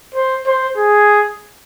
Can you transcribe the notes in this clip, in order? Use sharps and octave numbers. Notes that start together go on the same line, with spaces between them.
C5
C5
G#4